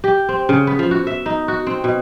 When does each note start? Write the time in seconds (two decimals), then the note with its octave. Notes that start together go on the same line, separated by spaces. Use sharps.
0.04 G4
0.29 C4
0.49 C#3
0.67 B3
0.79 F3
0.91 F#4
1.07 E5
1.26 D#4
1.48 F#4
1.67 C4
1.84 B2